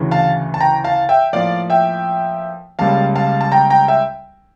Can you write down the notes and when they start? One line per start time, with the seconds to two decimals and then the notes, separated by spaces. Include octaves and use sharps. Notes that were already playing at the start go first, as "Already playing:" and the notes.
Already playing: D2 C#3 E3
0.11 F5 A5
0.54 A5
0.61 G5 A#5
0.84 F5 A5
1.09 E5 G5
1.33 A2 F3 A#3 D5 F5
1.70 E5 G5
2.79 C#2 C#3 G3 A#3 F5 A5
3.16 F5 A5
3.41 A5
3.52 G5 A#5
3.70 G5 A#5
3.88 E5 G5